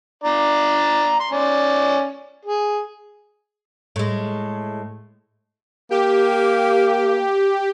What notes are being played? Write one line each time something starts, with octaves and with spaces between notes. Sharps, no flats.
D4 D5 A#5
C6
C#4 D5
G#4
A2 G#3
A#3 G4